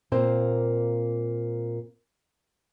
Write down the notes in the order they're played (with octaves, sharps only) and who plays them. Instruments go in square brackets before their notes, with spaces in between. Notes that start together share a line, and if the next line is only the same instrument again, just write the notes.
[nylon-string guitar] A#2 A#3 C4 C5